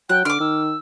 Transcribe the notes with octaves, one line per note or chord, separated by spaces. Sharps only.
F#3 G5 F#6
D3 D6 F6 D7
D#3 E6